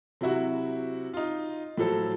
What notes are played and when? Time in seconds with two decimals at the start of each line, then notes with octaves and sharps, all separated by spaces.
0.21 C3 F#3 E4 F#4
1.13 D#4 F4
1.77 A2 F3 F#3 A4